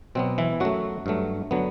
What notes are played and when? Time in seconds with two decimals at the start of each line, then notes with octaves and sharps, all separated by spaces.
0.15 B2 F#3 B3 C4
0.38 E3 E4
0.60 F#2 F#3 A3 F#4
1.06 G2 F#3 A3
1.51 D3 F#3 B3